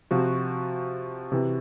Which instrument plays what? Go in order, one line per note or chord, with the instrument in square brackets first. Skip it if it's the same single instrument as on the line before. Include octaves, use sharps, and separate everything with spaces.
[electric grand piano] C3 F3 F#4
C3 E3